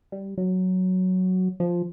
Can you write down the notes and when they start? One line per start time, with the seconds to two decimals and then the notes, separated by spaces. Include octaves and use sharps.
0.12 G3
0.38 F#3
1.60 F3